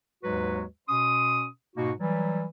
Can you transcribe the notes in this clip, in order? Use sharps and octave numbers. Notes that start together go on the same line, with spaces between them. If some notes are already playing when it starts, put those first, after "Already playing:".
D#2 G#2 F#3 G#3 F#4 B4
B2 C#4 C6 D#6
G#2 B2 A#3 D#4 F#4
E3 F#3 G3